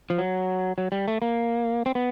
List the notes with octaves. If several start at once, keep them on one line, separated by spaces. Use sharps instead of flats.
F3
F#3
F#3
G3
A3
A#3
C4
B3